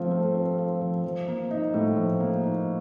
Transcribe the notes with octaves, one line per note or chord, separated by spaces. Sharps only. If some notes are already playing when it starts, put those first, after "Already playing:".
Already playing: F3 A3 C4 F4
A3
C4
F4
F3
F3
A#3
D#4
A2
F3
A#3
D#4